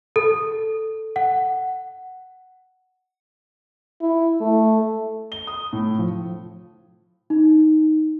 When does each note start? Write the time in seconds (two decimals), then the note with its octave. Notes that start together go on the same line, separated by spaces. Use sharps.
0.16 A4
1.16 F#5
4.01 E4
4.41 A3
5.32 G7
5.47 D#6
5.73 A2
5.99 F3
7.30 D#4